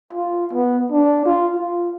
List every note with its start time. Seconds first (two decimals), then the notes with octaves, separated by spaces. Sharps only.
0.13 F4
0.53 B3
0.92 D4
1.26 F4
1.57 F4